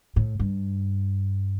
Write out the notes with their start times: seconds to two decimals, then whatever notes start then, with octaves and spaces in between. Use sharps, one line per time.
0.16 A2
0.39 G2